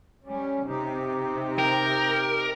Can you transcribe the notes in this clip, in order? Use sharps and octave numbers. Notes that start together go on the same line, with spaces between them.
G3 C#4
C3 D#4 G4
A#4 G5